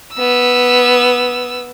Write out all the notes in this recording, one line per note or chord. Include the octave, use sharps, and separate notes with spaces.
B3 E6